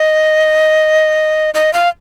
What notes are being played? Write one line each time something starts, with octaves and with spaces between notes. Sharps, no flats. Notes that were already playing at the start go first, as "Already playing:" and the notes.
Already playing: D#5
D#5
F5